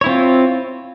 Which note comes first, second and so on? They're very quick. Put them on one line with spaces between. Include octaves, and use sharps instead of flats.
C#5 E4 C4 F4